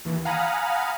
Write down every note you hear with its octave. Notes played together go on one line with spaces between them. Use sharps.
D#2 E3
F5 F#5 G#5 A#5 B5 D#6